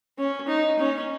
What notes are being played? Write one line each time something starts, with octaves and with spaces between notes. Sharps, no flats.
C#4
D#4
C#4